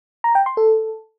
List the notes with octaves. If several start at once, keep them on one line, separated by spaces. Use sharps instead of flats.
A#5
G5
C6
A4